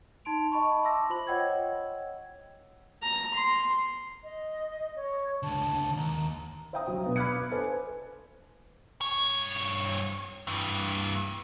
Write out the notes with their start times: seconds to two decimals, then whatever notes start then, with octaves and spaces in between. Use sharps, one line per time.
0.25 D#4 A5 C6 D7 F7
0.52 D#5 A5 B5 C#6
0.82 E5 A5 C6 D6 E6 A#6
1.10 F4 C5 B5 F#7
1.27 C#5 D#5 F#5 G5 E6 G#6
3.03 A#5
3.34 C6
4.24 D#5
4.96 C#5
5.43 C#2 D3 A5
5.97 D#2 A#5
6.73 C5 E5 F5 G5 A#5 D#6
6.87 F#3
7.04 B2 B3 F5
7.16 B5 D6 F6 F#6 G#6 C#7
7.35 B3
7.51 A4 B4 C5 G#5
9.01 G2 C#5
10.47 G2 E3